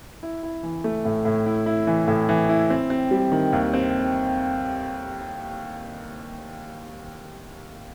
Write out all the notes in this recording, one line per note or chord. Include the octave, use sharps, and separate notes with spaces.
E4
E4
E3
A3
A2
A2
E4
E4
E3
A2
E3
E4
C4
C4
G3
D#3
D#2
C4